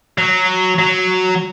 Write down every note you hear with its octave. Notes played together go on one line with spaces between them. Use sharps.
F#3
F#3